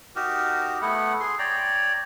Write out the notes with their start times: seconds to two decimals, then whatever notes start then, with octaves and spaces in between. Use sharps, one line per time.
0.16 D#4 F#4 G4 A#4
0.82 A3 B3 E4 F#5
1.20 G#4 C6
1.39 C#5 D5 G5 A#5